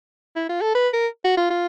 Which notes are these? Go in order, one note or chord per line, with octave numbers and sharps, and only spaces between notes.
E4
F4
A4
B4
A#4
F#4
F4
F4